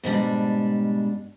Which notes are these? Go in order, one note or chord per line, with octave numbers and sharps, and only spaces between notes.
G#2 B2 G3 D4